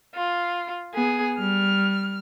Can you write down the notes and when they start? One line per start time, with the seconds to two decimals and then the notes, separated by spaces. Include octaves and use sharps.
0.15 F4
0.94 B3 G#4
1.39 G3 F6